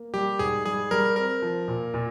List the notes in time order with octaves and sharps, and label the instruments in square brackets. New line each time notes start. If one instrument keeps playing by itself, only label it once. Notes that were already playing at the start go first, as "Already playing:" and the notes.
Already playing: [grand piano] A#3
[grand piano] G3 [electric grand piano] G4
[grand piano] G#2 [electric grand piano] G#4
[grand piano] G3 [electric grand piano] G#4
[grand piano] G3 [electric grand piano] A#4
[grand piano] C4 [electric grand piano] A#4
[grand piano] F3
A#2
A#2